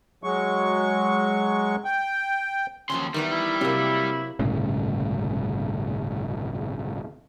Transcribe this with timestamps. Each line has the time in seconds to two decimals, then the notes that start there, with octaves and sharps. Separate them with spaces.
0.24 F#3 G#3 C#6
1.85 G5
2.90 D#2 F3 F#3 C#4 C6
3.14 D#3 E3 G3 B3
3.32 E4
3.61 C3 F#3 A#3
4.39 G1 C2 A2 C#3